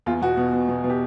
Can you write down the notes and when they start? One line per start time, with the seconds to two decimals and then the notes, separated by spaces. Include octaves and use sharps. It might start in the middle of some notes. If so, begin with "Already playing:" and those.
0.06 E2 F4
0.22 B2 F#4
0.37 B2
0.53 B2
0.69 B2
0.84 B2
0.90 G4